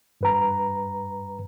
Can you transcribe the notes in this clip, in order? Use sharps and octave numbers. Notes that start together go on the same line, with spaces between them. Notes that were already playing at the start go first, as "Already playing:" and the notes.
G2 B4 A#5